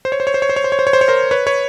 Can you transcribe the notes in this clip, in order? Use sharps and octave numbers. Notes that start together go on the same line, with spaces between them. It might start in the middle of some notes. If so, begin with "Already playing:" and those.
C5
C#5
C5
C#5
C5
C#5
C5
C#5
C5
C#5
C5
C#5
C5
C#5
A#4 C5
B4 C#5
B4 C#5